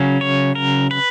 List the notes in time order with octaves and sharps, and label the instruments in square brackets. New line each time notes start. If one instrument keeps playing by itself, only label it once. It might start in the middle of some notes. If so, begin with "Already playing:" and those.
Already playing: [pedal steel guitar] C#3 F#3 C#4
C#5
A#4
B4